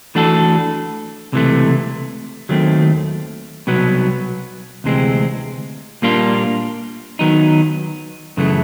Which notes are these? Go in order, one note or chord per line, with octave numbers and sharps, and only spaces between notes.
E3 A3 D4 F#4 A4
C#2 C3 E3 A3
D#2 D#3 F#3 A3 C4
C2 B2 F#3 B3
D2 C3 E3 G#3 C4
A#2 G3 A#3 D4 F4
D#3 F#3 B3 D#4
F#2 C#3 E3 A3